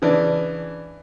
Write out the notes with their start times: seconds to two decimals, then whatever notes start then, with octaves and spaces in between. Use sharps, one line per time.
0.02 C#3 E3 D4